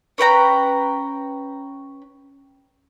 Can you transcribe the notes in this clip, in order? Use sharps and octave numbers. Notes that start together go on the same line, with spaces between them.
C#4 B4 G5 A#5